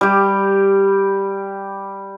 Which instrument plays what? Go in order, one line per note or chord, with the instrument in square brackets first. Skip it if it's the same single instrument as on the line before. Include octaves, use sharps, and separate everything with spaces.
[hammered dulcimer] G3 G4